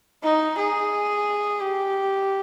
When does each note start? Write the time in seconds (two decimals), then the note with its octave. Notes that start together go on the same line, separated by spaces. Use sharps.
0.23 D#4
0.58 G#4
1.61 G4